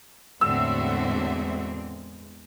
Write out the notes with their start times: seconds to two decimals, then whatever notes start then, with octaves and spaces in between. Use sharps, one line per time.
0.41 E2 A2 D3 G#3 C4 F#4 E5 E6